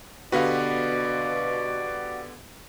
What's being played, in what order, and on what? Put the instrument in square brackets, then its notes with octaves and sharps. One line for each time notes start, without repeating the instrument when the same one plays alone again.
[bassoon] B2 [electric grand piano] D3 B3 B4 [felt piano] F#4 G4 F5 [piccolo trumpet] D5